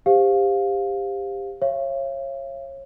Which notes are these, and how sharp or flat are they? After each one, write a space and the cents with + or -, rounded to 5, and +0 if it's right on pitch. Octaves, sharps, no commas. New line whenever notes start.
G4 +20 C5 +0 F5 +10
C#5 -25 F5 -45